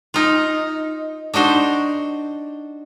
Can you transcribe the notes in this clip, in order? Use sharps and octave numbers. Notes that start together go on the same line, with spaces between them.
D#4 F4
D4 D#4 F#4 C5